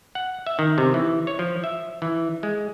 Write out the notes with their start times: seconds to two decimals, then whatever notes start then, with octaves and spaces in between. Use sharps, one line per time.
0.15 F#5
0.46 E5
0.59 D#3
0.78 C3
0.94 E3
1.27 C#5
1.39 F3
1.64 E5
2.02 E3
2.43 G#3